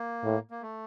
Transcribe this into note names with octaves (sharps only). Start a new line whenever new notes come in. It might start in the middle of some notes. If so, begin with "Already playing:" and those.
Already playing: A#3
A2
A#3
A3